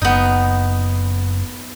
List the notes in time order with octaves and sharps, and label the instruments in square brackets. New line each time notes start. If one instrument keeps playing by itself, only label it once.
[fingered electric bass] F#1 [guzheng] B3 D#4